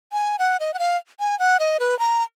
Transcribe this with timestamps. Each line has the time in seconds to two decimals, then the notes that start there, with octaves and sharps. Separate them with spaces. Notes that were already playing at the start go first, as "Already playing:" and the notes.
0.12 G#5
0.39 F#5
0.60 D#5
0.74 F#5
0.79 F5
1.20 G#5
1.39 F#5
1.60 D#5
1.80 B4
1.99 A#5